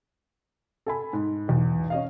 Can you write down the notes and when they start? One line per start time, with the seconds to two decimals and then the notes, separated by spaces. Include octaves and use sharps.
0.86 A4 G#5 B5
1.13 G#2
1.48 B1 E2
1.90 C#4 D#5 F5